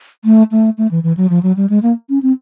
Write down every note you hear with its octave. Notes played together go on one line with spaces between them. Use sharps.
A3
A3
A3
E3
E3
F#3
F3
F#3
G3
G#3
A#3
C#4
C4